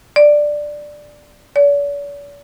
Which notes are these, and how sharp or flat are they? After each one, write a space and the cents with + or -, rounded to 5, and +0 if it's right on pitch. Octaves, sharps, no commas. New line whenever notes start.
D5 +5
D5 -45